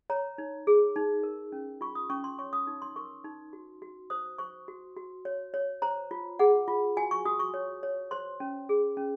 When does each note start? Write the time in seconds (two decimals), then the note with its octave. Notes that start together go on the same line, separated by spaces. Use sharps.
0.10 C#5 A#5
0.38 D#4
0.67 G#4
0.96 D#4
1.23 A#4
1.52 C#4
1.81 F4 C#6
1.95 D#6
2.10 C#4 C#6
2.24 C6
2.39 C#5 C#6
2.53 D#6
2.67 D#4
2.82 C6
2.96 A#4 C#6
3.24 D#4
3.53 F#4
3.82 F#4
4.10 C5 D#6
4.38 C5 C#6
4.68 F#4
4.97 F#4
5.25 C#5
5.54 C#5
5.82 C5 A#5
6.11 F4
6.39 G#4 F#5
6.68 F4
6.97 F#4 G#5
7.11 C#6
7.25 F#4 D#6
7.39 C#6
7.54 C#5
7.83 C#5
8.11 C5 C6
8.40 C#4
8.69 G#4
8.97 C#4